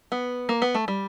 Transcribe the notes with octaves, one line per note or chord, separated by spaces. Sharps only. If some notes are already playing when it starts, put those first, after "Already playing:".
B3
A#3
B3
A3
G3